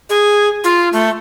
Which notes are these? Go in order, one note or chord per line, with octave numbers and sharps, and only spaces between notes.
G#4
F4
A3